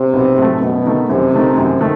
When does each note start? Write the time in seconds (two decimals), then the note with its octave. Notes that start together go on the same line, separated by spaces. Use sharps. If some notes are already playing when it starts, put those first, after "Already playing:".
Already playing: C3
0.13 B1
0.38 A2 F#3 A3
0.61 F#2 B2
0.85 D#3 A3 D#4
1.09 F#2 C3
1.34 D#3 A3 D#4
1.57 F#2
1.81 D#3 A3